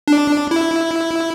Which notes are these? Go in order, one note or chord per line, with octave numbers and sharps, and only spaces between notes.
D4
E4